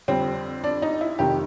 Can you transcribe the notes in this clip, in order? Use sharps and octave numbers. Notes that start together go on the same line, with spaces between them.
F2 D3 G3 C4
D4
D#4
E4
F1 F2 C3 D#3 G4